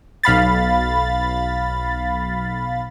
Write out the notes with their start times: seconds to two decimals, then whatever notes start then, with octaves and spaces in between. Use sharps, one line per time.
0.24 B1 F5 B5 A6